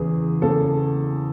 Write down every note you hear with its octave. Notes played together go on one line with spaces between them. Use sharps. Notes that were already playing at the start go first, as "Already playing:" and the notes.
Already playing: E2 C#3 E3 G#4
E2 C#3 E3 A4